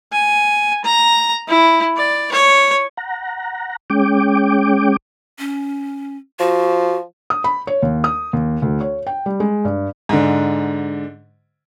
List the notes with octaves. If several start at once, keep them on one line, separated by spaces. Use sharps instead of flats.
G#5
A#5
E4
D5
C#5
F#5 A#5
G#3 C#4 G5 D6
C#4
F3 F#4
D#6
B5
C#5
D#2
D#6
D#2
D2
C#5
G5
G3
G#3
G2
G#2 D3